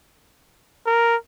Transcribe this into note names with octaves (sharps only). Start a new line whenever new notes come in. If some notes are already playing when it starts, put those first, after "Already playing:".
A#4